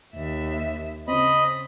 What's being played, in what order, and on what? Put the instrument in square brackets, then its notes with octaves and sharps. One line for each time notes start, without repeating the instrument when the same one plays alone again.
[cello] D#2 E5
[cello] C#3 [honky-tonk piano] C4 [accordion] D#5 B5